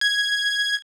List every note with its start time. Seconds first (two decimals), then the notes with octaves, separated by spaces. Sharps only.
0.01 G#6